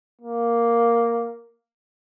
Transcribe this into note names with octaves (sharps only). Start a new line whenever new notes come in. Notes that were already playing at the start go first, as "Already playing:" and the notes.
A#3